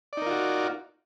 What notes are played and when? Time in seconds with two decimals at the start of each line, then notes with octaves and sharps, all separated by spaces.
0.13 D5
0.17 D#4
0.22 A#4
0.26 F4
0.31 F#4